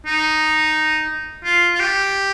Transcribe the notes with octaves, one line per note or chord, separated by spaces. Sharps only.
D#4
F4
F4
G4